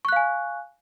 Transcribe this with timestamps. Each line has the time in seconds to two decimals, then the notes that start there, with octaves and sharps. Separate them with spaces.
0.05 C#6
0.09 F#6
0.12 F5
0.16 G#5